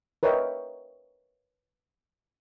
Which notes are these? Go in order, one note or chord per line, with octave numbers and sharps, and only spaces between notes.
A#4 B4 C#5 D#5 E5 G5